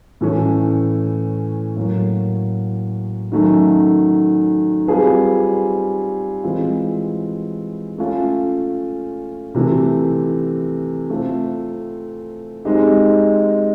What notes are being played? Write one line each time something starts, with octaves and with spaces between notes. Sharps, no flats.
A2 E3 A3 C#4
A2 F#3 A#3
D#3 F#3 A3 C#4
G3 C4 F4 G#4 B4
E3 G#3 C4 F4
A3 C#4 F4
C3 E3 A3
A3 C4 F4 A4 C5
G#3 C4 D#4 G4